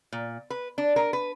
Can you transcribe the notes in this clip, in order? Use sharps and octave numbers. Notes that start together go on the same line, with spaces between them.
A#2
B4
D4
A#4
B4